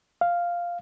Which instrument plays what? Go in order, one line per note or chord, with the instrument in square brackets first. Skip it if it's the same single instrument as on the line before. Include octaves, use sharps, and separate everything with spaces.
[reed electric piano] F5